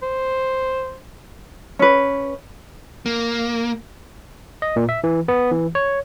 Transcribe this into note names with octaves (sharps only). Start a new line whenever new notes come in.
C5
C#4 B4
A#3
D#5
A#2
E5
E3
B3
E3
C#5